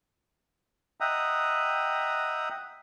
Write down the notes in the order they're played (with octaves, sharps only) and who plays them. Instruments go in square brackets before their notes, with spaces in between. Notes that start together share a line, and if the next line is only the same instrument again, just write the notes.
[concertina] D#5 E5 F#5 G5 A#5 D#6